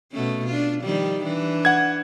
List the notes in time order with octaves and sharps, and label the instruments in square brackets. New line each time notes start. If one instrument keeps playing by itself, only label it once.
[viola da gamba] B2 A3 C#4
D4 F4
D#3 F3 G3
E3 D4
[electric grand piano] F#5 G#6